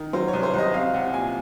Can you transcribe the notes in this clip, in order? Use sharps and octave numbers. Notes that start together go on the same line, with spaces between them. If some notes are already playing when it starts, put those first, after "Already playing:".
Already playing: D#3
F#3 C5
C#5
C2
C5
C2 D#5
C4 F5
C2 F#5
A#2 G#5